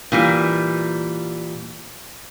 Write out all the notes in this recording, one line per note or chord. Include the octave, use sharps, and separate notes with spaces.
A#2 E3 G3